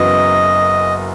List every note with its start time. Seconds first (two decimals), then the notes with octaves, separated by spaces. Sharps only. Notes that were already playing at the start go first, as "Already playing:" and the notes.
Already playing: F#1 F#2 E3 B3 F#4 D#5